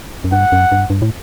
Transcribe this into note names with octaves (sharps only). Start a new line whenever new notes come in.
F#2
G2 F#5
F#2
G2
G2
A2